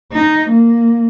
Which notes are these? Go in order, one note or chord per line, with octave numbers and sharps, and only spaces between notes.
D#4
A#3